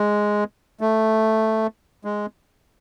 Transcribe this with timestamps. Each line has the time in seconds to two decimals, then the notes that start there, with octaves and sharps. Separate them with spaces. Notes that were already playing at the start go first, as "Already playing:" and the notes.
Already playing: G#3
0.81 A3
2.05 G#3